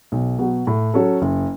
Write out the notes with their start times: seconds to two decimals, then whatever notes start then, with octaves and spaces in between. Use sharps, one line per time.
0.12 B1
0.39 B2 F#3
0.67 A2
0.94 F#3 C#4 A4
1.22 F#1